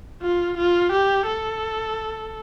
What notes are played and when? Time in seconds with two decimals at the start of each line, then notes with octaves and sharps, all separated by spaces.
0.22 F4
0.58 F4
0.92 G4
1.27 A4